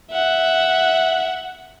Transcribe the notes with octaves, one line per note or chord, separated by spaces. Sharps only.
E5 F#5